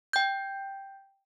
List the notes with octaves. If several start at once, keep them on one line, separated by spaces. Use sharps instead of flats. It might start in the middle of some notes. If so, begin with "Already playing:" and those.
G5 G6